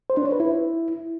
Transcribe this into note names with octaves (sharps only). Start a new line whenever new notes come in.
C5
D4
C#5
B4
E4